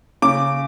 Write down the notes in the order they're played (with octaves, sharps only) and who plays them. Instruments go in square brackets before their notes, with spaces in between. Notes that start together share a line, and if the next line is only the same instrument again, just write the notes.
[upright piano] C#3 D6